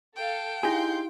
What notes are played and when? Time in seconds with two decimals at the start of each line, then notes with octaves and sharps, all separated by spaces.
0.16 A4 F5 G5
0.63 D#4 E4 G4 G#4 F5 C6 G6